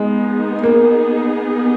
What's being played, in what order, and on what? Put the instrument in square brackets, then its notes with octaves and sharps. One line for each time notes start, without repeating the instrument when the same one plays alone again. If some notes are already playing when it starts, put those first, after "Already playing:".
Already playing: [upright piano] G#3 [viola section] B3 D#4 G#4
[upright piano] A#3